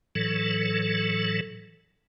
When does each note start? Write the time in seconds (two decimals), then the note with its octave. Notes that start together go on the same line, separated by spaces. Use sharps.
0.15 A2 E3 F#3 A4